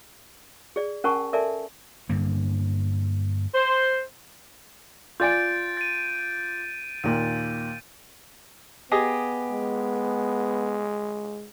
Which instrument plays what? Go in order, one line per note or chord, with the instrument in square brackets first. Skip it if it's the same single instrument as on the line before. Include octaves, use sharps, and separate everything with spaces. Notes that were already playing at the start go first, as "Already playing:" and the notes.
[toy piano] G#4 D5
C#4 A#4 F#5 G#5 A5 C#6
A4 A#4 D5 E5 G#5 A5
[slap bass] G2 D3 A#3
[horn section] C5
[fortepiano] F4 D5 G#5 [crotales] G6 A6 D7
[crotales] A6 D#7
[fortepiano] D#2 A#2 [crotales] D#7
[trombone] B3 [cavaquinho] G4 G#4 D#5
[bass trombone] G#3